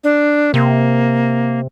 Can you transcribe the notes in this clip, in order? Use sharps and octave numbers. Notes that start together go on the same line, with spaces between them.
D4
C3 A#3